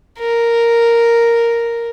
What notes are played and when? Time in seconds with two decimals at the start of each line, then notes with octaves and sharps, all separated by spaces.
0.19 A#4